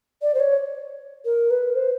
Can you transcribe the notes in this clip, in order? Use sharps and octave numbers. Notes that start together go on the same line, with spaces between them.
D5
C5
C#5
A#4
B4
C5